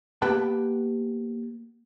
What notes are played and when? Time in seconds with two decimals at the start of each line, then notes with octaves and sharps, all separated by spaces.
0.22 A#3 B3 G4 B4 G5 A5